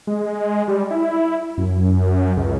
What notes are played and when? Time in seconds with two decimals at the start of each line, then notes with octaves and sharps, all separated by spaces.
0.07 G#3
0.68 G3
0.91 E4
1.58 F#2
2.37 C#2